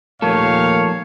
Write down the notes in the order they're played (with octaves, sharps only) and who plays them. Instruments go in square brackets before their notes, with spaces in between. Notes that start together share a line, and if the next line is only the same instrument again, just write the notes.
[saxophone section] D#2 A#2 [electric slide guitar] F3 A3 A4 [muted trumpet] C#5 [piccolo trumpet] F5